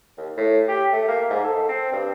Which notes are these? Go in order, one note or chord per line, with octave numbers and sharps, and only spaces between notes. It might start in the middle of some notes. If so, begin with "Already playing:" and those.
D#2
A2
G4
A3
A#3
G#2
A4
C4
G2